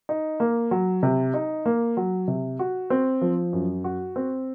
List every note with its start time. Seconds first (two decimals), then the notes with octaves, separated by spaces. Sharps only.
0.09 D#4
0.40 A#3
0.71 F#3
1.03 C3
1.34 D#4
1.66 A#3
1.97 F#3
2.28 C3
2.59 F#4
2.90 C4
3.21 F3
3.53 F#2
3.84 F#4
4.16 C4